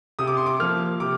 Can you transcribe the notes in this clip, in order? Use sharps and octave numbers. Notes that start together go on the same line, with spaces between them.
C3 D#6
D6
C6
D6
F3 A#3 F6
C3 D6